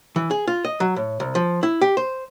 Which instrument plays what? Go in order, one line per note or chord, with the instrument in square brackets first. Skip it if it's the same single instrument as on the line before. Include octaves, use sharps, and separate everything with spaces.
[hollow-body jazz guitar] E3
G#4
F4
D#5
F#3
A2
C2
F3
E4
G4
C5